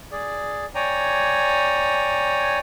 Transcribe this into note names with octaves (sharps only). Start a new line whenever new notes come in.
G#4 D5
C#5 D5 G5 G#5 A#5